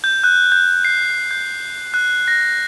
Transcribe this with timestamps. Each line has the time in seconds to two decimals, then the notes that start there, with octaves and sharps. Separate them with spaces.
0.04 G6
0.24 F#6
0.52 G6
0.85 C7
1.31 G6
1.94 F#6
2.28 A#6